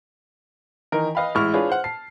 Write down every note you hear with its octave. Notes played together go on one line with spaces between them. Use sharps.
D#3 E3 D#4 A#4
B4 D#5 F5 G5 B5
A1 G#3 E4 C#6 F6
D4 F4 G#4 B4 C#5
C5 F#5
A5 C7